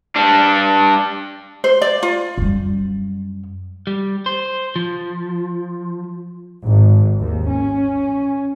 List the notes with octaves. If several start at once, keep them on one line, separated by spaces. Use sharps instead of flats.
G3 D4
C5
D5
F4
F#2 G3
G3
C5
F3
G#1
D#2
C#4